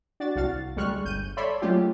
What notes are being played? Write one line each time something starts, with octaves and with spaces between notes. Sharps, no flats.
D4 F#4 A6
C2 F#4 F5 A6
D2 G3 G#3 C#6 F6 F#6
G1 G6 D#7
A4 C#5 D5 E5 B5 C6
F#3 G#3 A3 C#4 F4 G4